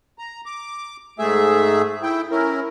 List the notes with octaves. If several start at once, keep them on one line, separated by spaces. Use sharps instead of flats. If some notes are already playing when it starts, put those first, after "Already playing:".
A#5
D6
G#2 A3 G#4 E5
E4 G5
C#4 E4 A#4